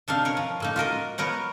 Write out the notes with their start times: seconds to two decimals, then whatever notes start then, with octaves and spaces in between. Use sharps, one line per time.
0.08 C3 D4 D#4 F5
0.25 A#4 C#5
0.37 F3
0.60 A2 A#3 D#4
0.76 F4 F#4 A#4 D#5
1.18 B3 A#4 C#5 F#5